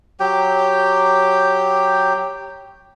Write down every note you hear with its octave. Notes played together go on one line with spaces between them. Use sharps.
F#3 G4 G5